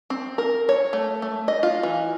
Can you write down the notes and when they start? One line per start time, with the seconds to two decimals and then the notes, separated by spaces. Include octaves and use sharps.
0.10 C4
0.38 A#4
0.69 C#5
0.93 A3
1.22 A3
1.48 D#5
1.63 F4
1.83 E3